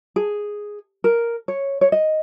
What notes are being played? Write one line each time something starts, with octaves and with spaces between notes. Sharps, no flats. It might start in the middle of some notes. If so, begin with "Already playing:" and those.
G#4
A#4
C#5
C#5
D#5